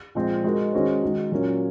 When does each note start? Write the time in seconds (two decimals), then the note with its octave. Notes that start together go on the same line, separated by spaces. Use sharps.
0.15 A#2 F3 G#3 C4
0.44 G#3 D#4 F#4 A#4
0.73 D#3 G#3 C#4 F#4 C5
1.02 D#3 G#3 D#4 F#4
1.32 A#2 F#3 A#3 C#4